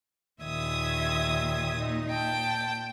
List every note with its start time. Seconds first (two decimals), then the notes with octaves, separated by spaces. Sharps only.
0.42 D#2 A#2 D#3 E5 D#6 G#6
1.77 A#2 D#4
2.09 A#2 G5 A5